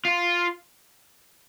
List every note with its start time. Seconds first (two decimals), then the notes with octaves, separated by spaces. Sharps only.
0.05 F4